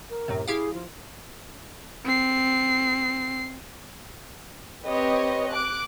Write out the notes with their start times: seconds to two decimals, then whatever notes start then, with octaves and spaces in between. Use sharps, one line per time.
0.10 A#4
0.28 F#2 A2 C3
0.48 E4 G4 G#4 F5
0.74 F3
2.05 C4 C7
4.85 C4 G4 B4 C#5 D#5
5.51 D6 F#6 D7